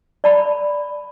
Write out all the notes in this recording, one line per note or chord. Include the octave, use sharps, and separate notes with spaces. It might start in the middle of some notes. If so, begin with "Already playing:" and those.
D5 A5 B5